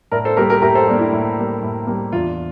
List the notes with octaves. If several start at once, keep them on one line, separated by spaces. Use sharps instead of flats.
A2 A#4 D5
A4 C5
G3 A#3 G4 A#4
G4 A#4
A2 G4 A#4
A4 C5
G3 A#3 D4
E4
A2
G3 A#3
A2
G3 A#3
E2 D4 F4